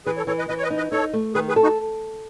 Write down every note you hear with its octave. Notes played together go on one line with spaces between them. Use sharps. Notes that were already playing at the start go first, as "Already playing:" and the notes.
E3 G#4 B4
A4 C#5
E3 A4 C#5
B4 D#5
E3 B4 D#5
C#5
B4 D#5
D#4
B4 D#5
D#4 A4 C#5
A3
D#3 G#4 B4
G#4 B4
A4
D#4 F#4